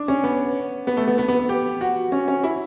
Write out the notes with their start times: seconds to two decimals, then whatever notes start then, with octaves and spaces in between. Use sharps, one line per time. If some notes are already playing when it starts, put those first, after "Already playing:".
Already playing: D4
0.08 C#4
0.24 B3
0.87 B3
0.97 A3
1.07 B3
1.18 B3
1.28 B3
1.39 B3
1.49 G4
1.81 F#4
2.12 C#4
2.28 C#4
2.44 E4